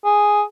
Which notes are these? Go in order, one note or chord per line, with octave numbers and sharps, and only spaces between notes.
G#4